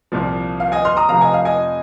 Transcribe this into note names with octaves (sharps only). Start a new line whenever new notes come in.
C2 A#2 F3
F5
D#5 G#5
C6 F6
A#5 D#6
F1 F2 C3 F3 F5 A#5
D#5 G#5
F5
D#5 G#5